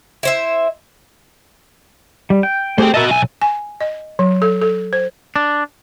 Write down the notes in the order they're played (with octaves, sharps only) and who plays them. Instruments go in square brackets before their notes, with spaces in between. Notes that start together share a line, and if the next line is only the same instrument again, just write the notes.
[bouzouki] E4 C5 E5
[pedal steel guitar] G3
G5
[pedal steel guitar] A3 G4 G#4 [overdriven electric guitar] C5 G5
[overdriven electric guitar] F#4 D#5 [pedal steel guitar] A#4 E5 A5
[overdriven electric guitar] B1 G#5 [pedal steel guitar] E5
[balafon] G#5
D#5
F#3
A4
A4
C5
[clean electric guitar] D4